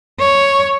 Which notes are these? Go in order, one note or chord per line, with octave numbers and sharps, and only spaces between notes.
C#5